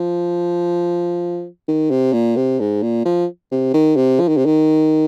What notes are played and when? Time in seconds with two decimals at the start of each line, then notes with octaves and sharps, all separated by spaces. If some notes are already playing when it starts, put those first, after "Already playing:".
Already playing: F3
1.68 D#3
1.91 C3
2.13 A#2
2.36 C3
2.60 G#2
2.83 A#2
3.05 F3
3.52 C3
3.74 D#3
3.97 C3
4.20 F3
4.28 D#3
4.38 C3
4.46 D#3